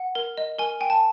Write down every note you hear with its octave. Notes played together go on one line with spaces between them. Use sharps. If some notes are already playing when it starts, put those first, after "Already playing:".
Already playing: F#5
A#4
D#5
A#4 G#5
G5 G#5
A5